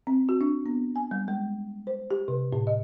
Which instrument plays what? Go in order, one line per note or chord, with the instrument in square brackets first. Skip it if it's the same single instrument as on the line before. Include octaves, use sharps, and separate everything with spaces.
[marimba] C4
F#4
D4
B3
G#5
G3
G#3
C5
G4
C3
A2
D#5